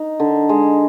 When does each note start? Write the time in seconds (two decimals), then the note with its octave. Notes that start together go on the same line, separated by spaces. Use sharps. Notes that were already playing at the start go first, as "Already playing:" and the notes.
Already playing: D#4
0.20 D3
0.49 G#3